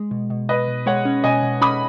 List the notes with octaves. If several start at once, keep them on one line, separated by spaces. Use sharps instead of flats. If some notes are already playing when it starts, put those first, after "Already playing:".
Already playing: G#3
B2
B2
B2 B4 D#5
B2
G#3 C#5 F#5
C#4
B2 D#5 G#5
B2
C#4 B5 D#6